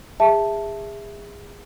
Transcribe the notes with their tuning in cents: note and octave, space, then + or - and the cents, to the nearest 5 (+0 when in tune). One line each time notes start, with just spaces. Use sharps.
G#4 -30 E5 +0 A5 +0